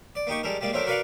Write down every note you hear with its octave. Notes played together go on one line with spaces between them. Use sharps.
D5
A#3 D#4 G4 C#6
G3 G#3 A4 A#4
G3 G#3 A#3 D5
F#3 A3 C4 D4 A4 A#4
F#4 A#4 B4 D5 F5 F#5